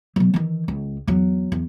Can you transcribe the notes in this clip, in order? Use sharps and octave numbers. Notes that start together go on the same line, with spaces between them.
B2 F#3
D#3 E3
C#2
E2 F#3
E2